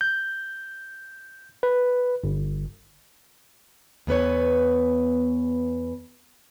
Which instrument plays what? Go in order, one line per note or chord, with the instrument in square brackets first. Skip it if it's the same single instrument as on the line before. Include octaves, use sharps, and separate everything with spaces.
[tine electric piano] G6
B4
G1
[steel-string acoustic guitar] E2 B3 B4 C#5